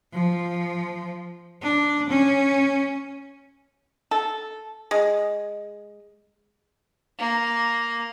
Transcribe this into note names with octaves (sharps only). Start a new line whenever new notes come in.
F3
D4
C#4
A4
G#3
A#3